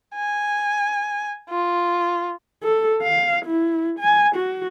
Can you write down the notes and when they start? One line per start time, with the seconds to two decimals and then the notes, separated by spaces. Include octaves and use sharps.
0.15 G#5
1.49 F4
2.63 A4
3.03 F5
3.46 E4
3.99 G#5
4.36 F#4